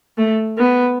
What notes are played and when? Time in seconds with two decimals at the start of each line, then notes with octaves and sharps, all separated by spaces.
0.18 A3
0.58 B3